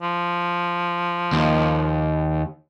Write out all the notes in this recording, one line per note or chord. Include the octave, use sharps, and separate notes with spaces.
F3
D#2